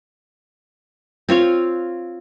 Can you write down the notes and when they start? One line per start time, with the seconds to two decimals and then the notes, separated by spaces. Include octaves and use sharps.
1.29 C4 F4 C#5 F5